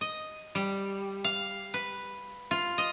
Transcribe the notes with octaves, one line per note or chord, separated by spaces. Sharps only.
D#5
G3
F5
B4
F4
D#5